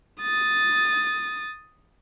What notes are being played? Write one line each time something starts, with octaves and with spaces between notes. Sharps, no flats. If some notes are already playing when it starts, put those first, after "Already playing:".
D#6 A6